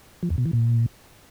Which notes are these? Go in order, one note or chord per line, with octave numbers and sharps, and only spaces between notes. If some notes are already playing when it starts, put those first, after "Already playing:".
F3
E2
B2
E3
A#2